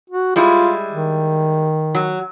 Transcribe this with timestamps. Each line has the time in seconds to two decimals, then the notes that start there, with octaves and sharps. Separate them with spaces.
0.10 F#4
0.36 G3 G#3 E4 F4
0.91 D#3
1.95 F#3